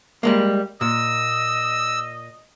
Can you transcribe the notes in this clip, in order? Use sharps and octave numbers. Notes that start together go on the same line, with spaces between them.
G3 G#3 A#3
A#2 D#5 E6